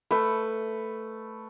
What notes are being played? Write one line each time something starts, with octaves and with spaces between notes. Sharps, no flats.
A3 B4